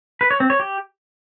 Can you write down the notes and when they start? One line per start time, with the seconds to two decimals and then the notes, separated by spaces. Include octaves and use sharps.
0.21 B4
0.31 C#5
0.40 C4
0.50 C#5
0.60 G4